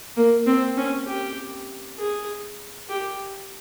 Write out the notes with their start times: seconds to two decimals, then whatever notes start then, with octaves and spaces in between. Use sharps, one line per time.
0.17 A#3
0.47 C4
0.77 C#4
1.07 G4
1.99 G#4
2.89 G4